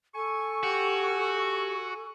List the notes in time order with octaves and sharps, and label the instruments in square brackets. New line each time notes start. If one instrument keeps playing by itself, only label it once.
[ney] A4 [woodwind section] G#5 C#6
[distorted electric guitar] F#4 [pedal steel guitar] G4